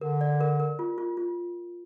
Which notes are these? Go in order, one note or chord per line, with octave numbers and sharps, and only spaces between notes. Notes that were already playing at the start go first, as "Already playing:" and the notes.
D3 A#4
D5
A#4
A#4
F4
F4
F4